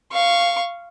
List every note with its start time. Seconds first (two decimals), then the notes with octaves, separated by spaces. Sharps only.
0.12 F5 C#6